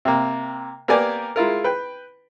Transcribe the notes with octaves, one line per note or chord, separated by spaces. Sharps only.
C3 A#3
A#3 B3 G4 A#4 D5 G#5
G#3 E4 F4 A#4
B4 G5